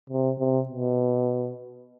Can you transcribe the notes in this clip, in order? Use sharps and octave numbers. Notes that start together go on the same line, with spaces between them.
C3
C3
B2